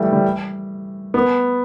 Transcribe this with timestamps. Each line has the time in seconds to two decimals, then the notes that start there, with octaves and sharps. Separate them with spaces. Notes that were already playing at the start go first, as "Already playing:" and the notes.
Already playing: E3 G3 A3
0.13 G3
1.14 B3